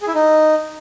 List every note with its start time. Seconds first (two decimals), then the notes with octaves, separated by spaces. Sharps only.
0.01 G#4
0.08 E4
0.15 D#4